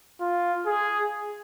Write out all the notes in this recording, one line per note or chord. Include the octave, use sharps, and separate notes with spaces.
F4
G#4